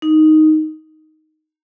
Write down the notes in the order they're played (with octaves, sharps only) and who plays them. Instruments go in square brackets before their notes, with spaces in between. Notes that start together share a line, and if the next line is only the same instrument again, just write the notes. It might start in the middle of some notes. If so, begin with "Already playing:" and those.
[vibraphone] D#4